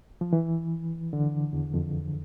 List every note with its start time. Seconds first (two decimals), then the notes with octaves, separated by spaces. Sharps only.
0.21 F3
0.33 E3
1.13 D3
1.53 E2
1.74 F2